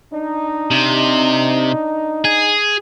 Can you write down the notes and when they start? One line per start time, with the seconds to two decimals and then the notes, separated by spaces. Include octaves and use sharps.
0.13 D4 D#4
0.71 C3
2.25 G#4